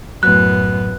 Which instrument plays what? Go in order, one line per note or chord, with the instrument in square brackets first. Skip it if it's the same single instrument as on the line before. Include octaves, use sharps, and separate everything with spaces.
[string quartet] F#2 B3 [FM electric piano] A2 F#3 [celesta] F#6